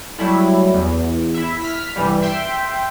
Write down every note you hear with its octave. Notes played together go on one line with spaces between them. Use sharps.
F#3 G3 A3 E4
E2
E4 E5
F6 B6
C2 G2 E3 G3
E5 G5 C6